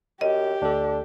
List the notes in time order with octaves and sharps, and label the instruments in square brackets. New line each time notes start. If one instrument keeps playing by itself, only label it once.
[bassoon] F#2 [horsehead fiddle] G4 [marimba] D#5
[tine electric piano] D2 A4 [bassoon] D4